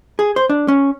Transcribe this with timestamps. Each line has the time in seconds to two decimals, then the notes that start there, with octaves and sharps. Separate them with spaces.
0.19 G#4
0.36 C5
0.50 D4
0.68 C#4